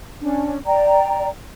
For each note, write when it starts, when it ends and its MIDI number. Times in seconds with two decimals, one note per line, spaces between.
0.21 0.56 61
0.21 0.56 62
0.66 1.27 74
0.66 1.27 79
0.66 1.27 82